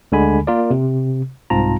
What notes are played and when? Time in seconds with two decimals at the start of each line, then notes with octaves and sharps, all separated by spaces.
0.12 D2 D3 G#3 G#5 B5
0.47 A#3 F4 A#4 D5
0.71 C3
1.50 C2 G#2 C4 F4 A5 A#5